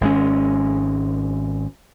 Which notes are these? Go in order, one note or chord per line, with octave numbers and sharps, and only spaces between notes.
G#1 G#3 C#4